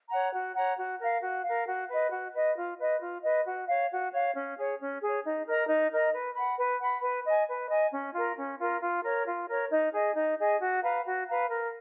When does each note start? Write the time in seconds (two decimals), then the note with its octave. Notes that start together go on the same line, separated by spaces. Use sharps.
0.10 C#5 F#5 A#5
0.33 F#4
0.55 C#5 F#5 A#5
0.77 F#4
0.99 A#4 F5
1.21 F#4
1.44 A#4 F5
1.67 F#4
1.89 B4 D#5
2.11 F#4
2.34 B4 D#5
2.56 F4
2.78 B4 D#5
3.01 F4
3.23 B4 D#5
3.45 F#4
3.68 C#5 F5
3.91 F#4
4.12 C#5 F5
4.35 C#4
4.56 G#4 C#5
4.79 C#4
5.02 G#4 C#5
5.24 D#4
5.47 A#4 D#5 A#5
5.68 D#4
5.91 A#4 D#5 A#5
6.13 B4
6.35 F#5 B5
6.58 B4
6.80 F#5 B5
7.02 B4
7.25 D#5 G#5
7.48 B4
7.70 D#5 G#5
7.93 C#4
8.14 F4 A#4
8.37 C#4
8.59 F4 A#4
8.82 F4
9.04 A#4 C#5
9.27 F4
9.48 A#4 C#5
9.71 D#4
9.93 G#4 D#5 G#5
10.16 D#4
10.38 G#4 D#5 G#5
10.61 F#4
10.83 B4 F5 A#5
11.05 F#4
11.27 B4 F5 A#5
11.50 A#4